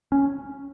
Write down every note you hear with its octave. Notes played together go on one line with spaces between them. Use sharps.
C#4